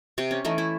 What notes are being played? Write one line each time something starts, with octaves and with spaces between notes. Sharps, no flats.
C3 C4
C#4
E3 A3 D#4
E4